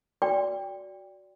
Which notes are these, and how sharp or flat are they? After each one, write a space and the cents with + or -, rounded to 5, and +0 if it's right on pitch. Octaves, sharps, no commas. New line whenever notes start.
F#4 +0 D5 -15 G5 +10